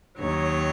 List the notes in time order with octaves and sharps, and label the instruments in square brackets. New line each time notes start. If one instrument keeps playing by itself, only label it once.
[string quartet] D#2 D#3 F#3 C#5